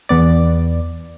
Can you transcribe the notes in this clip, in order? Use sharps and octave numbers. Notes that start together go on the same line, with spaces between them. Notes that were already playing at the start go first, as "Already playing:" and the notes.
E2 B3 D5